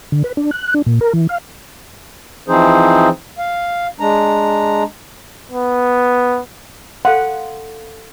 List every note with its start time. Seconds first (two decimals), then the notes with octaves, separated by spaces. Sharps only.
0.12 D3
0.24 B4
0.37 D4
0.51 F#6
0.74 D4
0.86 A#2
1.01 A#4
1.13 E3
1.29 F5
2.48 E3 F3 C4 D#4 G#4 C5
3.38 F5
4.00 G#3 D4 A#5
5.52 B3
7.05 A4 F5 F#5 C6